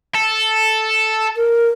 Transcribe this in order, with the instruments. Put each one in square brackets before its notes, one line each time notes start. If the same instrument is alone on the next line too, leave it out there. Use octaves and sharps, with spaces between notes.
[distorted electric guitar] A4
[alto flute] A#4